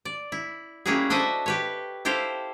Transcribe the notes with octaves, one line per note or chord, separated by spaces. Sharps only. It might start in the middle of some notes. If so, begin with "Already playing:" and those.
D5
E4
G3 A#3 C#4 E4 F#4 G#4
D4 A4 C5 D#5 E5
G4 B4 C#5
E4 G4 A4 C5 F5